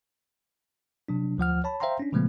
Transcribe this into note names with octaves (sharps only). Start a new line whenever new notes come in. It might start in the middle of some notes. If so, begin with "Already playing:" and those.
C3 F#3 D4
D2 F3 F#5 F6
C#5 A5 B5
C5 E5 F5 G5 A#5 C6
C#4 D4
A#2 C#3 F3 G#3 A3 B3